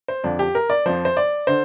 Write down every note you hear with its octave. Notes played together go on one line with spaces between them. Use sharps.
C5
F2 D3 F3 D4
G4
A#4
D5
F2 F3 C5
C5
D5
D3 C5